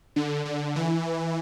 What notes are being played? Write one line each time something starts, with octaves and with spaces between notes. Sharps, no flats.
D3
D3
E3